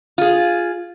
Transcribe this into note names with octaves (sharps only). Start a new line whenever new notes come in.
F4 G#4